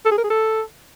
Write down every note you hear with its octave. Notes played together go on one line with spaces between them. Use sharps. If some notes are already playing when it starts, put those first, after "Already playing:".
A4
G#4
A#4
G#4
A4